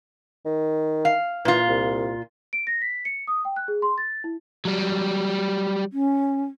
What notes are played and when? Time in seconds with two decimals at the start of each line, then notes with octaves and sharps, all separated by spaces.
0.46 D#3
1.05 F5
1.45 A#2 E3 F4
1.68 C2
2.53 D7
2.67 A#6
2.82 B6
3.05 C#7
3.27 D#6
3.45 G5
3.56 F#6
3.68 G#4
3.82 C6
3.98 A6
4.24 E4
4.65 F#3 G3
5.93 C#4